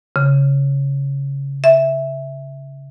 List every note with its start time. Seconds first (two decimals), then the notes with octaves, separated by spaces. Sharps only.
0.16 C#3
1.64 E5